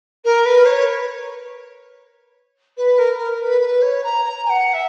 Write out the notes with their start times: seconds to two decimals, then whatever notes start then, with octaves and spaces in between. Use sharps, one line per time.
0.24 A#4
0.45 B4
0.65 C#5
2.77 B4
2.98 A#4
3.18 A#4
3.40 B4
3.61 B4
3.82 C#5
4.03 A#5
4.24 A#5
4.45 G#5
4.49 F#5
4.73 E5